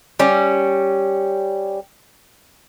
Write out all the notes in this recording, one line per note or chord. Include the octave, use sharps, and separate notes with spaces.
G3 C#4